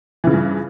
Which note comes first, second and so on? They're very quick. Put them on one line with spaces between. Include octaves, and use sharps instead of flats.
E3 C#3 F3 G2